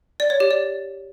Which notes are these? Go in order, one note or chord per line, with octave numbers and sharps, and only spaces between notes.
D5
C#5
G4
D5